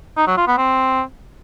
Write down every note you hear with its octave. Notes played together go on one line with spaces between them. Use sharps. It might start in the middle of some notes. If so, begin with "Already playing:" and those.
D#4
F#3
F4
B3
C4